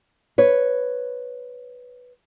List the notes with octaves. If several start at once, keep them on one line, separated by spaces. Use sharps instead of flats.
B4 C#5